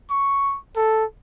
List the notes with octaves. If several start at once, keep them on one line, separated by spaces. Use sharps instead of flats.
C#6
A4